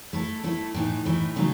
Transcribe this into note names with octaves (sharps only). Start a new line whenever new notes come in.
A3 E4 A4
A3 E4 A4
A2 E3 A3 D#4
A2 E3 A3 D#4
C#3 F#3 A3 D#4